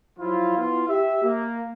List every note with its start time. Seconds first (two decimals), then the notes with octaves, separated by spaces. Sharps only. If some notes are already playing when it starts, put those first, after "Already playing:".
0.19 F3 F#3 E4 F4
0.57 B3 E4 F4
0.89 G4 E5
1.23 A#3